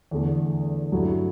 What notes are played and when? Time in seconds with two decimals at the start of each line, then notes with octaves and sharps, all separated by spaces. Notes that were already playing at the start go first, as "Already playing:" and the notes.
0.11 E2 D3 A3
0.92 G2 F#3 A3 E4